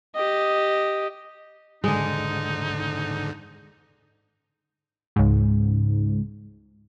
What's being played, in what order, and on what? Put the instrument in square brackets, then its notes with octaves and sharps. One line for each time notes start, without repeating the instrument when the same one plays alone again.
[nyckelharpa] G4 D#5
[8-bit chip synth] G#2 D3 [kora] G#3 [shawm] D#4
[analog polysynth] C#2 G#2